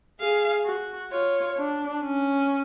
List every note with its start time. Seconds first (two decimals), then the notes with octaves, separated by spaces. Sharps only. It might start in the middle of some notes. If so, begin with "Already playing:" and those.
0.20 G#4 F5
0.65 F#4
1.12 F4 C#5
1.57 D4
2.03 C#4